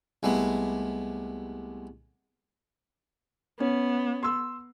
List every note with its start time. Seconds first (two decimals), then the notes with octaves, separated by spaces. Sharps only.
0.23 C2 G#3 A3 B3
3.60 B3 C#4
4.23 C6 E6